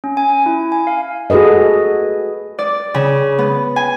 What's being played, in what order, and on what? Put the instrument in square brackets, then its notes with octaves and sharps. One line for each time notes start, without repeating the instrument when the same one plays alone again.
[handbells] C#4
G#5
E4
G#5
F5
[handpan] F#4 G#4 A4 B4 D#5
[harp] D5
C#3
B3
G#5